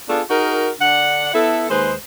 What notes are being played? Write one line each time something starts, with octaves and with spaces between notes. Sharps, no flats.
B3 D4 F4 G#4 A4
D#4 F#4 G#4 A#4
D3 D4 F#5
B3 E4 A4
D#2 G#3 G#4 B4 C5